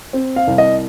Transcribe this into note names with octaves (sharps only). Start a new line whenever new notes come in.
C4
F5
C2
D#5